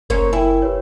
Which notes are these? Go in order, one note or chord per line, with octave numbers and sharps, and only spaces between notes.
F#1 A#3 C#4 A#4 C#5 C6
E4 A#4 G5 G#5
G4 B4 C#5